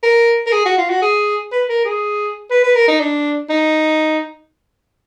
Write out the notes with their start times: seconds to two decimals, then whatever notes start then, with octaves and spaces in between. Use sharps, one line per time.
0.03 A#4
0.46 A#4
0.53 G#4
0.66 F#4
0.78 F4
0.90 F#4
1.02 G#4
1.52 B4
1.69 A#4
1.85 G#4
2.50 B4
2.64 B4
2.75 A#4
2.88 D#4
3.00 D4
3.49 D#4